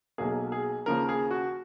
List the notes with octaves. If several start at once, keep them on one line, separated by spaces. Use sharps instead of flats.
B1 B2 F#3 A#3 G#4
G#4
D#2 C#3 F3 A#3 A#4
G#4
F#4